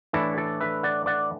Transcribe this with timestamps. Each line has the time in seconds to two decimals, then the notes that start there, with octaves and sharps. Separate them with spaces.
0.13 A2 E3 D4 E4 A4
0.38 A4 D5
0.60 B4 E5
0.83 D5 F#5
1.06 D5 F#5